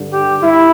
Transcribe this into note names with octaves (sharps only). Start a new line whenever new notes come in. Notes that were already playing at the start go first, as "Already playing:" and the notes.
Already playing: G2 D3
G4
G2 E4